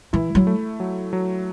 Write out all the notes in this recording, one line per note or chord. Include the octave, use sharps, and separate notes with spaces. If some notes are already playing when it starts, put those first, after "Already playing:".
E3 E4
F#3
A3
F#3
F#3